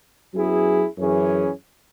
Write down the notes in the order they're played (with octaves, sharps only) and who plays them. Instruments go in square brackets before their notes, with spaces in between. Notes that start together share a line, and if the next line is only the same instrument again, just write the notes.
[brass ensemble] F#2 F#3 B3 E4 G#4
F#2 E3 C#4 G#4